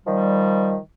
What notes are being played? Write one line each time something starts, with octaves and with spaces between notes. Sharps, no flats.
D#3 F3 G3